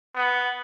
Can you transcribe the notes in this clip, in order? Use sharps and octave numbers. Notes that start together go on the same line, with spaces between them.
B3